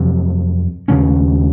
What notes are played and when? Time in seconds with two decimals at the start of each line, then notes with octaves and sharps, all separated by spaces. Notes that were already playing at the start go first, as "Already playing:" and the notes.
Already playing: F2 C3 F#3
0.88 D#2 C#3 G#3 C#4